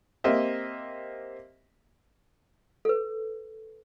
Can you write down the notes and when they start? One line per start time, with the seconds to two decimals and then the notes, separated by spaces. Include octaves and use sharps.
0.24 A#3 C4 G4 D#5 E5
2.85 A4 B4